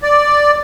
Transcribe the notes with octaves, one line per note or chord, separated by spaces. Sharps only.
D5